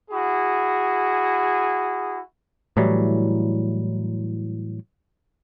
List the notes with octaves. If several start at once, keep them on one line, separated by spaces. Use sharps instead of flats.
E4 F#4 G#4
A2 E3 F#3 G3